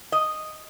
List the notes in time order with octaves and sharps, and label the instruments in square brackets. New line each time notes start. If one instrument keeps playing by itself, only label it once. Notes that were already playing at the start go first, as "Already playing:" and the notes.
[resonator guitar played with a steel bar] D#5